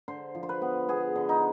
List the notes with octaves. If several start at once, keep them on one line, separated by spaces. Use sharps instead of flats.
D3 C5
F3
C5
B4
B3
B3 G#4
D3
D#4